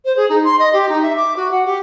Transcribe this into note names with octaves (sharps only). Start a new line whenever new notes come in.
C5
G#4
D#4
C6
D#5
G4
D#4
E5
D6
F#4
F#5
G4